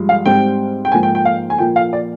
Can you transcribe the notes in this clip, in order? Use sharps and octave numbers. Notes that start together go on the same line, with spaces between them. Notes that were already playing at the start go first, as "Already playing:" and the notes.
Already playing: G2 F3 G#3
F5
G#2 G3 C4 G5
G5
G#2 F3 A#3 G#5
G5
G5
F5
G#5
A#2 F3 A#3 G5
F5
D5